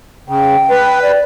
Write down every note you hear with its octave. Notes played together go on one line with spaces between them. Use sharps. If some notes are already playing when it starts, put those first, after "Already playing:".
C#3 G5
B4
D5